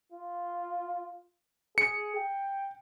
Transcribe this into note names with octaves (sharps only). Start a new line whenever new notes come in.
F4
G#4 C#7
G5